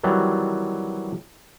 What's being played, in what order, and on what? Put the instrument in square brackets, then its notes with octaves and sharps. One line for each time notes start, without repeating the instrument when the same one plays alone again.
[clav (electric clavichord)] D#3 E3 F#3 G3 C4